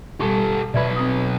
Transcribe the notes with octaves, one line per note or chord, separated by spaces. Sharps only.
B2 G3 G4 A4
B1 B4 D5 E5 G#6
C4 D#6